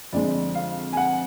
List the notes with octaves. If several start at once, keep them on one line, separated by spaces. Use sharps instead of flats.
F2 D3 G#3 D5
F5
G#5
F#5